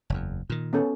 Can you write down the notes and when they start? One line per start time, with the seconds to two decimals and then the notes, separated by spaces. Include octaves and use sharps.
0.10 F#1 E2
0.50 A#2 D#3
0.73 B3 C#4 A4